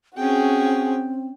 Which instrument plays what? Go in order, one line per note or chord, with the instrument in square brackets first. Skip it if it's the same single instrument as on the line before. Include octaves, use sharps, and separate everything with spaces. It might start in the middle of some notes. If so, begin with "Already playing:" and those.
[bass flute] C4 [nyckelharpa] C#4 G5 [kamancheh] F#4 G#4